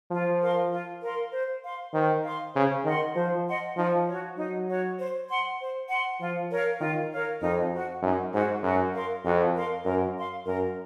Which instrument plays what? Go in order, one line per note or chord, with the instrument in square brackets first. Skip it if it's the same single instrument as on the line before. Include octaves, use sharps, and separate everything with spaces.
[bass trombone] F3 [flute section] F4
[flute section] A#4 F5 C6
F4
A#4 F5 C6
C5
F5 C6
[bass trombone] D#3 [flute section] C5
[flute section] F5 C6
[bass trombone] C#3 [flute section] C5
[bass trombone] D#3 [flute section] D#5 F#5 C6
[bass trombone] F3 [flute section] C5
[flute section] D#5 F#5 C6
[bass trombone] F3 [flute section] D#4
[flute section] F#4 C#5
[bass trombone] F#3 [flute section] D#4
[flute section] F#4 C#5
C5
F#5 C6
C5
F#5 C6
[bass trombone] F3 [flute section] F4
[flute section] A#4 C#5 F5
[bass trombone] D#3 [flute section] F4
[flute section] A#4 C#5 F5
[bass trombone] F2 [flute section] D#4
[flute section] F#4 C5 F#5
[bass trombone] F#2 [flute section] D#4
[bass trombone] G#2 [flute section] F#4 C5 F#5
[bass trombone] F#2 [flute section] F#4
[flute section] A#4 F5 C6
[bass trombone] F2 [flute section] F#4
[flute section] A#4 F5 C6
[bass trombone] F#2 [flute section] A#4
[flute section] F5 C6
[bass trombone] F#2 [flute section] A#4